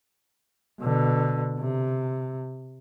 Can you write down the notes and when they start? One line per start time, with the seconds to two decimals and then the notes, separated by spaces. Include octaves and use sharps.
0.80 B2 D3
1.59 C3